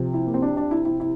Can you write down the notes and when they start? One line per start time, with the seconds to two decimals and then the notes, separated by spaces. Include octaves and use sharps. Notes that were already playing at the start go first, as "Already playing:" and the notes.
Already playing: C3 F3
0.14 E4
0.27 A#3
0.34 C4
0.42 D4
0.57 D4
0.71 E4
0.85 E4
1.00 E4